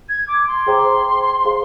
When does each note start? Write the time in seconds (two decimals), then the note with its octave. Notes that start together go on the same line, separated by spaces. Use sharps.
0.09 G#6
0.28 D6
0.47 C6
0.66 G#4 C5 G5 A#5 D6
1.45 G#4 C5 F5